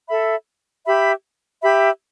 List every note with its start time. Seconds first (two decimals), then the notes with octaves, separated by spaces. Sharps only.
0.08 A4 E5 B5
0.85 G4 E5 B5
1.62 G4 E5 B5